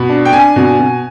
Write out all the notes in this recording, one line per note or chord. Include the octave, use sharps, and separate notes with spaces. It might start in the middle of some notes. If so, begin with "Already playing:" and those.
Already playing: B2 B5
D4
G5
D4 G#5
B2
B2